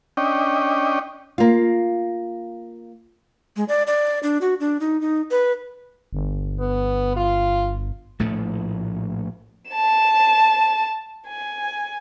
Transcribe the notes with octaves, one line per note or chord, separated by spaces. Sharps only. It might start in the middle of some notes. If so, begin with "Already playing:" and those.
C#4 D4 D#5 G5
A#3 F4
G#3
D5
D5
D4
F#4
D4
D#4
D#4
B4
G1
B3
F4
A#1 A2 F3 A3
A5 E7
G#5